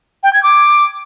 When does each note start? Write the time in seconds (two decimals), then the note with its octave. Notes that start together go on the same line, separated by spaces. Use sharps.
0.23 G5
0.33 G#6
0.43 D6